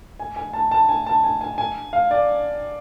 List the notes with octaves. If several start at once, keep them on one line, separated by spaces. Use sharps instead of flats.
G#5
G#5
A5
A5
G#5
A5
G#5
G#5
G#5
F5
D5